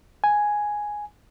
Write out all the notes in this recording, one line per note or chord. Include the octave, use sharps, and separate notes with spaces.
G#5